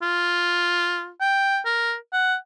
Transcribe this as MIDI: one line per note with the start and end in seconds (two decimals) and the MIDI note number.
0.02 1.10 65
1.21 1.59 79
1.65 1.95 70
2.13 2.36 78